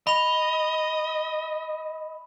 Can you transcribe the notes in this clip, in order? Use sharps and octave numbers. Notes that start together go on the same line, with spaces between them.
D#5 B5 F7